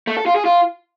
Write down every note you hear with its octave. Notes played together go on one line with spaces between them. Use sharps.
A3
A4
F4
G#4
F4